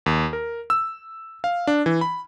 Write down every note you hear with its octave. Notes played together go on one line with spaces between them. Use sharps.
D#2
A#4
E6
F5
D4
E3
B5